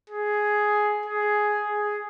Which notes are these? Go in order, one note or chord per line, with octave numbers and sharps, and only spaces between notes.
G#4
G#4
G#4